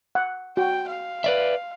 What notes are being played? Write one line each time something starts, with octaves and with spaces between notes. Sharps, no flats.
F#5
F#4 G5
F5
B4 D5 E5